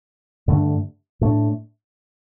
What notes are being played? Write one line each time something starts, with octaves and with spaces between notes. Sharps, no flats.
G2 D3 A3 D4
A2 A3 D4